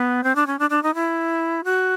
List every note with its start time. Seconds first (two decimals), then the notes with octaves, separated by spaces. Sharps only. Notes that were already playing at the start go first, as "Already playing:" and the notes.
Already playing: B3
0.24 C4
0.36 D4
0.47 C#4
0.59 D4
0.70 D4
0.83 D#4
0.95 E4
1.64 F#4